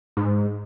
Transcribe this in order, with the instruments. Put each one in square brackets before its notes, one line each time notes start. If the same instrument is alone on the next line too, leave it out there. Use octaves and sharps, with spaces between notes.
[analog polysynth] G#2